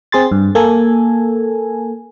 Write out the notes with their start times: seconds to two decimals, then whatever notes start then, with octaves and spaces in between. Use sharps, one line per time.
0.12 C4 G#4 C6 A6
0.32 G2
0.55 A#3 A4 G#5